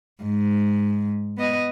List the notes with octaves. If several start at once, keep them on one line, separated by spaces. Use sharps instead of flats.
G#2
B3 D#5